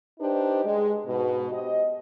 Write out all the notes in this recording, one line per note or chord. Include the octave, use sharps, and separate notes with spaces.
D4 D#4 G4 B4 C5
G#3
G#2 B2
G4 C5 D#5